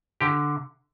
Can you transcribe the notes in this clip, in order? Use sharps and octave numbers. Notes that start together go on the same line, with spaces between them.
D3 G4